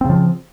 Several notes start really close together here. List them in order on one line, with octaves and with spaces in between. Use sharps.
C4 C#3 F3